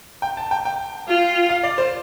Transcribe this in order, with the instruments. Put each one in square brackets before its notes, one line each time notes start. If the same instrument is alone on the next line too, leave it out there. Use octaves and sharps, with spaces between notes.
[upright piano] G5
A5
G5
G5
[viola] F4
[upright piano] F5
D5
C5